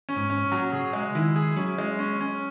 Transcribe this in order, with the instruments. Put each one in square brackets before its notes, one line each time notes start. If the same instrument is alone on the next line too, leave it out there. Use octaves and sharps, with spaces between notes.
[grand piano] C#4
[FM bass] G#2
[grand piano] C#4
[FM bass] A#2
[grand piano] F#3
[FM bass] C#3 [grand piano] G#4
[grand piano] G#3
[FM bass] D#3 [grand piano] E4
[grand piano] G#4
[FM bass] F#3 [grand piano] C#4
[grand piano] G#3
C#4
C#4